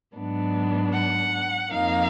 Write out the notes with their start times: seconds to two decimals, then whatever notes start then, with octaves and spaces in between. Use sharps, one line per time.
0.14 G#2 F#3 B3 D4
0.92 F#5
1.71 F2 F3 A#3 D#4 F5